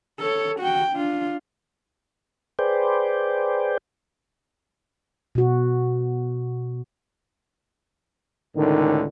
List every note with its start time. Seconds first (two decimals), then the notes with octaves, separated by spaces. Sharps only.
0.19 A4 C#5
0.60 F#4 G5
0.92 D4 F4
2.59 G#4 B4 C5 D5 G5
5.35 B2 F#4
8.56 C#2 A2 D3 D#3